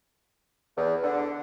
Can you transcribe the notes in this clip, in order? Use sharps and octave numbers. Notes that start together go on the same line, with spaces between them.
E2
D3